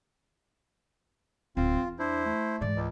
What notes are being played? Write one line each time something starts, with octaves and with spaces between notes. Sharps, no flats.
D1 C4 F4
E2
D4 E4 C5
A3
G#2 E3 D5
C#2